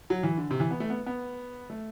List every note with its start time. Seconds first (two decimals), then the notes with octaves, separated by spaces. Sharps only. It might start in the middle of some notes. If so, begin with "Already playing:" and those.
0.10 F#3
0.23 E3
0.37 D3
0.51 C3
0.60 E3
0.71 B3
0.80 A3
0.90 B3
1.06 B3
1.70 A3